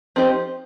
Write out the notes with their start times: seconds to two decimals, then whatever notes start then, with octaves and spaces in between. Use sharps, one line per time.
0.16 F3 C4 D#4 G4 C5